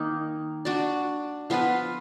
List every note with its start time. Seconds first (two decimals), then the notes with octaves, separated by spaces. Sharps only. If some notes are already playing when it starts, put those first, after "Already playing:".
Already playing: D#3 A#3 D#4
0.65 D4 F#4 D5
1.50 F3 B3 F4 B4